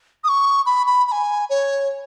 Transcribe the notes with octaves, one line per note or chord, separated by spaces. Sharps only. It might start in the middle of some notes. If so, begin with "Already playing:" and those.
D#6
C#6
B5
B5
B5
G#5
C#5